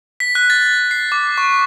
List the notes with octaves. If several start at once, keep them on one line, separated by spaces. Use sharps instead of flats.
B6
F#6
A6
C7
D6
C#6